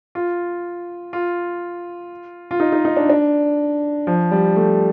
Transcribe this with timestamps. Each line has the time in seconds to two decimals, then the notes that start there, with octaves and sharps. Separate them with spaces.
0.15 F4
1.13 F4
2.51 F4
2.60 D#4
2.72 D#4
2.85 D#4
2.97 D4
3.09 D4
4.07 F3
4.31 G3
4.56 A3